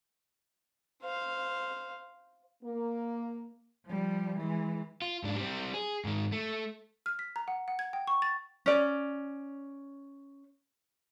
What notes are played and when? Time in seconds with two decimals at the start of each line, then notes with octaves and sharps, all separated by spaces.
1.03 C5 F5
2.63 A#3
3.86 F3 G3
4.37 E3 G#3
5.02 F4
5.23 G#2 D4
5.36 G3 C4
5.74 G#4
6.05 G#2 D#3
6.32 A3
7.06 F6
7.19 B6
7.36 A#5
7.48 F#5
7.68 F#5
7.79 G#6
7.93 G5
8.07 C#6
8.22 A6
8.66 C#4 D5